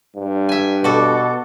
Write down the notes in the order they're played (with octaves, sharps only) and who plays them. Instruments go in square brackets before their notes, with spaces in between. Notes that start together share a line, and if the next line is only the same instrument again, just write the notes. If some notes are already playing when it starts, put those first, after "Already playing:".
[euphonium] G2
[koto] E5 G#5
[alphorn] B2 [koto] F#4 A4 [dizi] D6